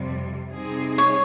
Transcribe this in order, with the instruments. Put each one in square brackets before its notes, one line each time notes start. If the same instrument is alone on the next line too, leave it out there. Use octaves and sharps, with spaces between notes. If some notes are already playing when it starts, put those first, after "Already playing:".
Already playing: [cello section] F2 C3 G3
C3 G3 C4 D#4 G#4
[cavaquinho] C#5